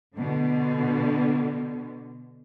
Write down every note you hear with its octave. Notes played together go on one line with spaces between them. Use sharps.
B2 D3